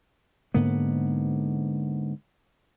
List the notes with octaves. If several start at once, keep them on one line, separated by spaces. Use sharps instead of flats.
G#2 D3 A#3 B3